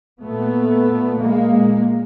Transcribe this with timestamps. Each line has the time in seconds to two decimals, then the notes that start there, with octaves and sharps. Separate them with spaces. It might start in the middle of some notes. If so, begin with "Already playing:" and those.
0.22 A#2 A3 B3
0.87 A#2
1.20 G#3 A#3
1.52 A#2